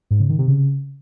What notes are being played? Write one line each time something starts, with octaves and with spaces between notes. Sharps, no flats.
G#2
C#3
D#3
C3
C#3